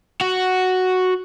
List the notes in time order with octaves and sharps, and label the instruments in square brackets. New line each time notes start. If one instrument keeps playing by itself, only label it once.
[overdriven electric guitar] F#4